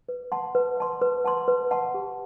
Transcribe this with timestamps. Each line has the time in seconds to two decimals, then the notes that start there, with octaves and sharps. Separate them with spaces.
0.09 B4
0.32 F#5 A5 C6
0.55 B4
0.77 F#5 A5 C6
1.01 B4
1.24 F#5 A5 C6
1.48 B4
1.71 F#5 A5 C6
1.94 G4